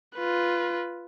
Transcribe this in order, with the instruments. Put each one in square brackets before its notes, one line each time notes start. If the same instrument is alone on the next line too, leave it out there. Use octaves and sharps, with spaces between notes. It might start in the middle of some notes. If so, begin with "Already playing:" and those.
[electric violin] F4 B4